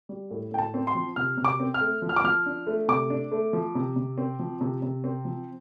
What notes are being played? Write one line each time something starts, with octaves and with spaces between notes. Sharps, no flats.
G3
A2
A2 G5
A5
C4
C6
F3
C3 F6
C3
D6
C4
F6
A3
F3
F6
D6
F3 F6
D4
A3
C3 D6
D4
A3
F3
C3
C3
C4
F3
C3
C3
C4
F3